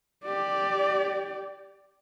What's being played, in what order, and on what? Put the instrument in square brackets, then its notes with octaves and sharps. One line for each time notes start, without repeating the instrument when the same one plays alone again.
[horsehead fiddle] G4 D5